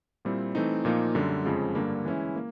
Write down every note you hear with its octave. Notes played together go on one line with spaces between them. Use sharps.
A#2 G3 C4 E4
E3 A3 C4 D#4
A#2 F3 A#3 D#4
F#2 D3 G3
F2 C#3 F3 G#3
G2 D3 G3 A#3
E3 G#3 C#4 E4
A#3